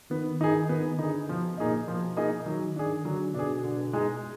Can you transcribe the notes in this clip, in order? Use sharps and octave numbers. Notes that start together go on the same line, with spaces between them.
D#3 B3
D#3 D#4 G#4
D#3 B3
D3 D#4 G#4
B2 F3
A#2 A#3 D#4 G#4 D#5
B2 F3
A#3 D#4 G#4 D#5
D#3 F#3
D#3 D4 G#4
D3 F#3
B2 D4 G#4
D3
G#3 D#4 G#4